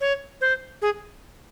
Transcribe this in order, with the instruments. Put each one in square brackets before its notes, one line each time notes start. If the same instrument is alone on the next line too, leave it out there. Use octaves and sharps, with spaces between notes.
[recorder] C#5
C5
G#4